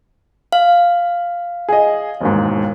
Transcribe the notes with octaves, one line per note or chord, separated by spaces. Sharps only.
F5
G#4 D#5
E1 D#2 G#2